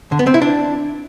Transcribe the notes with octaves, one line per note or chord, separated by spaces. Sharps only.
D3
B3
C4
E4
D4